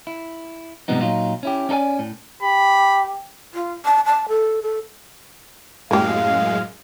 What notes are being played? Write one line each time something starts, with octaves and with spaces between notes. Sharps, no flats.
E4
G#2 C3 F3 G3 B3 D#4
A#2 F#3 D#4 F4
C#4 E4 G4
C#4 D#4 A4 D5 G#5
A2
G4 B5
F4
A5
A5
A4
A4
F#2 A2 G#3 A#3 G4 F5